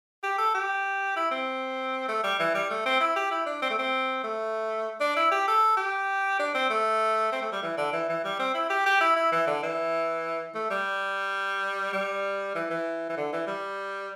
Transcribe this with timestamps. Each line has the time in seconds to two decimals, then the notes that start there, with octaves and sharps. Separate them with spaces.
0.23 G4
0.38 A4
0.55 G4
1.16 E4
1.31 C4
2.08 A3
2.23 G3
2.40 E3
2.55 G3
2.70 A3
2.86 C4
3.01 E4
3.16 G4
3.31 E4
3.46 D4
3.62 C4
3.70 A3
3.79 C4
4.24 A3
5.01 D4
5.17 E4
5.32 G4
5.48 A4
5.77 G4
6.40 D4
6.55 C4
6.70 A3
7.32 C4
7.41 A3
7.53 G3
7.63 E3
7.77 D3
7.93 E3
8.09 E3
8.25 G3
8.39 C4
8.55 E4
8.70 G4
8.86 G4
9.01 E4
9.16 E4
9.32 E3
9.47 D3
9.63 E3
10.55 A3
10.70 G3
11.93 G3
12.55 E3
12.70 E3
13.10 E3
13.17 D3
13.33 E3
13.47 G3